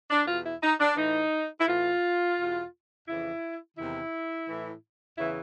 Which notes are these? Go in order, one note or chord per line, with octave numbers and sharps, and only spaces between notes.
D4
B2 F4
E2
E4
D#4
D4
A2 E3 D#4
E4
A2 E3 F4
E2 B2
F2 C#3 E3 E4
E2 C3 D#3 E4
A2 E3
E2 C#3 E3 E4